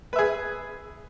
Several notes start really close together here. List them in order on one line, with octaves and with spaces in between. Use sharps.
B4 E5 G#4